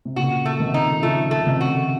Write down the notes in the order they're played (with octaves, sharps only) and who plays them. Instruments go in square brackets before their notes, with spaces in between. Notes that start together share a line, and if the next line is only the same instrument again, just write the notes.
[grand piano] C3
[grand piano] A#2 C#3 [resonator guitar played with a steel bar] F#4
[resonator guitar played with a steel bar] A3
[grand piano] C3 D#3
[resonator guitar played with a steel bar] D#4
[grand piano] C#3 F3 [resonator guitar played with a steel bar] A3
[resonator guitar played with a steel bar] A3
[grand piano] C#3
C3 D#3
[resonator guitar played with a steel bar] F#4